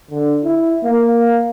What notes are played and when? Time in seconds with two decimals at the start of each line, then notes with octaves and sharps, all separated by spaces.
0.11 D3
0.44 E4
0.85 A#3